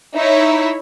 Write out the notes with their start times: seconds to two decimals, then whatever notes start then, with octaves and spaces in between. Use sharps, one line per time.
0.15 D#4 E4 C#5 E5